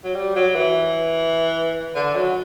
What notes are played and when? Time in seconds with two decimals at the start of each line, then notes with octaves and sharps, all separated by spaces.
0.04 F#3
0.15 G3
0.36 F#3
0.55 E3
1.95 D3
2.15 F#3